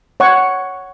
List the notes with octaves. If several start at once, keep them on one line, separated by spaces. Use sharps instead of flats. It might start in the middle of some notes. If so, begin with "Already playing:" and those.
C#5 F#5 C#6